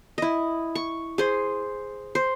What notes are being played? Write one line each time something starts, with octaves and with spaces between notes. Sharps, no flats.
E4 D#5
C#6
G#4 C5
C5